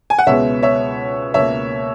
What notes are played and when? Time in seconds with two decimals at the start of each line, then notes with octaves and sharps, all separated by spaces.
0.10 G#5
0.19 F#5
0.27 C#2 B2 G#3 B3 C#5 E5
0.63 C#5 E5
1.34 C#2 B2 A#3 C#5 E5